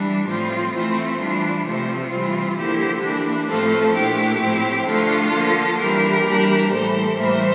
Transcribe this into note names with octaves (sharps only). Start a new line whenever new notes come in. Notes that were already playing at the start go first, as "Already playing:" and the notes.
Already playing: E3 G3 D4
A2 F3 C4 F4
E3 A3 C4 F4
E3 G3 D4
C3 F3 A3 C4 F4
E3 G3 C4
D3 F3 A#3 E4 G4
E3 A#3 D4
A2 F3 A3 C4 F4 A4
A#2 A3 D4 E4 G4
A2 F3 C4
D3 F3 A3 D4 F4 A4
D3 F3 A#3
E3 G3 D4 G4 A#4
E3 G3 A#3 D4
A2 E3 G3 A4 C5
A2 E3 G3 A#3 C5 E5